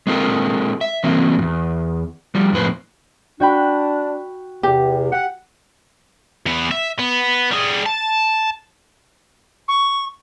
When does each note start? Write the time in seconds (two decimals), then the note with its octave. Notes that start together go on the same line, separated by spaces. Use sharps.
0.07 G#3 C4 F4 A4 A#4
0.81 E5
1.04 E3 F#3 A#3 C4
1.39 E2 G2
2.35 F3 G3
2.52 F2 A2 B4 C5
3.40 D4 F#4 G5 B5
4.63 E2 C3 G4
5.12 G4 F#5
6.46 E2 B3
6.71 E5
6.99 B3
7.51 G3 G#4
7.86 A5
9.68 C#6